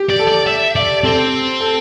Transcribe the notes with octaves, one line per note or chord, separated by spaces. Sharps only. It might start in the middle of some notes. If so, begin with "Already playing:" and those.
Already playing: G4
D5
A4
D5
E5
D5
C4 A4
A4